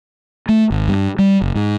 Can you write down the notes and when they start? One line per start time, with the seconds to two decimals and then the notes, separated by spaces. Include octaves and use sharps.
0.49 A3
0.70 G#1
0.88 G2
1.19 G3
1.42 F#1
1.55 G#2